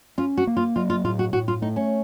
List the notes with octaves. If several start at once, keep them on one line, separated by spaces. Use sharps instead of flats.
C#4 F4
F#4
A#3
F4
F#3 F4
F4
A2 F4
F#4
A2 F#4
F4
A3 D#4
C#4